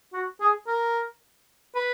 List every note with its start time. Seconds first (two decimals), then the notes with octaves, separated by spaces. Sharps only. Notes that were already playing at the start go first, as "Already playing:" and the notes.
0.13 F#4
0.41 G#4
0.67 A#4
1.76 B4